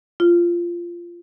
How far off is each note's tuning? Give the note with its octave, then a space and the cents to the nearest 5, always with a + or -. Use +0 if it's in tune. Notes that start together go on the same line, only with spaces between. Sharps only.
F4 -15